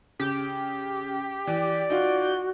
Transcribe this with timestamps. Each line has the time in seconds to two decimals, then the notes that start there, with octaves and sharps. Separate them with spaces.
0.20 C#3 G4
1.47 E3 D5
1.90 D#4 F4 F#4 G6